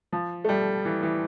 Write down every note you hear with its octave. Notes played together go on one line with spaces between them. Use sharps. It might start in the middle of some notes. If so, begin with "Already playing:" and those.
F3
A3
G3
E3
E3